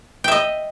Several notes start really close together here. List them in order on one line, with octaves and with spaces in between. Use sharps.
G5 E5 D#5